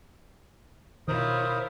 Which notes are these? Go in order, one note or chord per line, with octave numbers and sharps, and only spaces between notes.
B2 D#3 E4 F4 A#4 C5 C#5 D#6